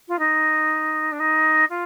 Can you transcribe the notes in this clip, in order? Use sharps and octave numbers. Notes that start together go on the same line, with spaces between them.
F4
D#4
D4
D#4
F4